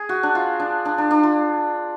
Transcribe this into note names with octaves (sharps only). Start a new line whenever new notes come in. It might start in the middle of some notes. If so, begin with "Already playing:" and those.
Already playing: G#4
F#4
D4
F4
D4
D4
D4
D4
F4